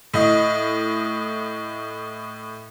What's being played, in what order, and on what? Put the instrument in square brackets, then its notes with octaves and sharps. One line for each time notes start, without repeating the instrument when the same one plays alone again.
[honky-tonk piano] A2 D#5